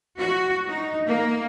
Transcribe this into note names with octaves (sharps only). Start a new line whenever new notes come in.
F#4
D#4
A#3